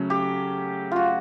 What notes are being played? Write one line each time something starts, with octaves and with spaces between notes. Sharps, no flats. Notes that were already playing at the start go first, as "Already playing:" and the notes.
Already playing: C#3 F#3 A3 C#4
G4
F4 F#4